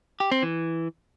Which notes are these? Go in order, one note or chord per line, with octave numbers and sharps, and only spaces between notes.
G4
C4
E3